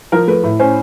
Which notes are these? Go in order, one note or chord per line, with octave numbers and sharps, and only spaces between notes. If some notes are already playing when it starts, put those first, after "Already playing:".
F3 A#4
A3 B4
A2
C#4 C5